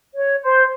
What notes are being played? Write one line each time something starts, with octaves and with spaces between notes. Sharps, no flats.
C#5
C5